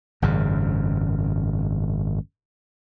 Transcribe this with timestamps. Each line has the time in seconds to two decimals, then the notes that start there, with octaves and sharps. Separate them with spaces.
0.22 G#1 F#2 C#3